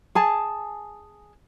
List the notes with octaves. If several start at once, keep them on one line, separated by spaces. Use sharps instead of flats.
G#4 G#5 A5